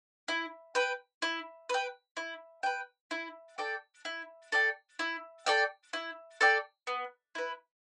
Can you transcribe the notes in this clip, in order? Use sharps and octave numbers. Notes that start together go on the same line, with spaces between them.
E4
B4 G5
E4
B4 G5
E4
B4 G5
E4
A4 D5 G5
E4
A4 D5 G5
E4
A4 D5 G5
E4
A4 D5 G5
B3
E4 B4